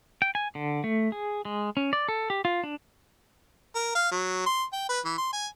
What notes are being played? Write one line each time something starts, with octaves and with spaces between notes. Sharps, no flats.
G5
G#5
D3
A3
G#4
G#3
C#4
D5
A4
G4
F4
D4
A#4
F5
F#3
C6
G5
B4
E3
C6
G#5